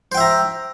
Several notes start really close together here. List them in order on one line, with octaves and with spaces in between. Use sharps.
C5 G5 E5 A#5